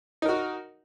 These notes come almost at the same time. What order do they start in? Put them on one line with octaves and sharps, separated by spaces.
D#4 A#4 F#4